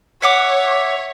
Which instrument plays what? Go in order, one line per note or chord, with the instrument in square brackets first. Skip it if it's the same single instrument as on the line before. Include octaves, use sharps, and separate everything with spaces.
[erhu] C#5 [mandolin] E5 F#5 D6